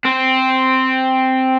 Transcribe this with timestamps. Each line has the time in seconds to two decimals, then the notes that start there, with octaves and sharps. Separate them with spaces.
0.05 C4